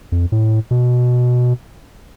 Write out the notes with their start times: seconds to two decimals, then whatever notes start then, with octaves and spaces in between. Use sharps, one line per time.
0.12 F2
0.32 A2
0.71 B2